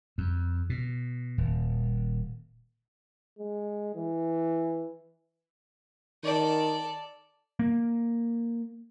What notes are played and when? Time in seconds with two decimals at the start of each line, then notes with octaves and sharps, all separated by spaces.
0.18 F2
0.70 B2
1.38 D#1
3.38 G#3
3.95 E3
6.23 D#3 A4 D5
7.59 A#3